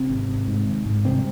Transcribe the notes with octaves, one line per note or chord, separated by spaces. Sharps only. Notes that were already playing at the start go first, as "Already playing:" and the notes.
Already playing: C3 C4
G#1
G#1
G#2
G#1
G#2
C2 C3 C4